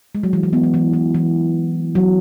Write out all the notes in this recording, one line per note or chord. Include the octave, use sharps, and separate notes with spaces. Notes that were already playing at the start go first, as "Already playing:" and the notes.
G#3
F#3
E3
E3
B3
E3
E3
E3
E3
F#3